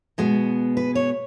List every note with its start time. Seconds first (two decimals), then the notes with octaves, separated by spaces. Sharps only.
0.18 B2 G#3 B3
0.77 B4
0.95 C#5